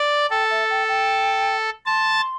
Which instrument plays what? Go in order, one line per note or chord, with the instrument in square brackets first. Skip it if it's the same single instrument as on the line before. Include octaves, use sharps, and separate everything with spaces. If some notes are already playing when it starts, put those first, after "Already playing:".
Already playing: [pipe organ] D5
[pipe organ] A4 [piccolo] G5
[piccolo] E5
G5
G5
[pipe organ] A5 [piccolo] C6